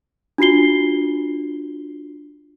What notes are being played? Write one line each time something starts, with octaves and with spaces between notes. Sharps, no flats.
D4 F4 F#4 C7 G7